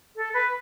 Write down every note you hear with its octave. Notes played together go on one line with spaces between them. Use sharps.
A4
B4